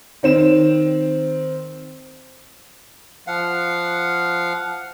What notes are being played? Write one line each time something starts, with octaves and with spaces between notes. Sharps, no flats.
D#3 C4 E7
F3 F5 F#5